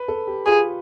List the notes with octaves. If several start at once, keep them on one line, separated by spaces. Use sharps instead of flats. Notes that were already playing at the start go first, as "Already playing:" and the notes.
Already playing: B4
A4
G4
F4 G#4